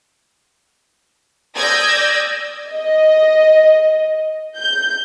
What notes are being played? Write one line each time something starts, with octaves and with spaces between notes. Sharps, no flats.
D5 D#6 E6 G6 G#6 A#6
D#5
G6